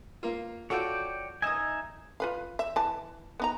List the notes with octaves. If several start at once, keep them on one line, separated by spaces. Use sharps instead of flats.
A#3 F4
F4 F#4 A4 C#5 D5 G5
D#4 D#5 E5 G#5 D#6
F4 B4 F5
E5
E3 A5
B3 D#4 A#5